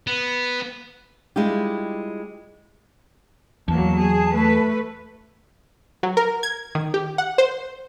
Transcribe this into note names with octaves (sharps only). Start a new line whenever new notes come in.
B3
G3 G#3 D4 E4 F4 G4
E2 F#3 A#3 A5
G#4
A3 B4
F#3
A#4
G#6
D#3
G4
F#5
C5